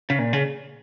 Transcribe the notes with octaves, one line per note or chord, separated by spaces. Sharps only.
C#3
A#2
C#3